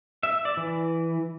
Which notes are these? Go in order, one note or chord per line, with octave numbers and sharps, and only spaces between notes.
E5
D5
E3